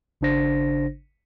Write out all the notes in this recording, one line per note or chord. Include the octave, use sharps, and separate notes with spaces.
G#1 C#3 D4 C5 A#6